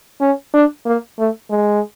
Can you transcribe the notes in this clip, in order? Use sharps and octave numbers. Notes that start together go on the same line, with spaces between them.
C#4
D4
A#3
A3
G#3